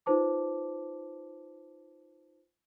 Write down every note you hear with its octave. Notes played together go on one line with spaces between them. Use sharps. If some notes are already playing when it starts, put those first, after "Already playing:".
D#4 F4 B4 C5 A5 D6